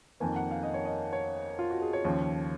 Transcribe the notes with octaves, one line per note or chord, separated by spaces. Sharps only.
F2 D#3 A#3 G#5
F#5
F5
D#5
C#5
D#5
C#5
F4
F#4
G#4
C#5
D#2 C#3 F3